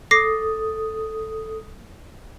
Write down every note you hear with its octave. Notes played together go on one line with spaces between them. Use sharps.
A4 D6 D#6 A#6 C7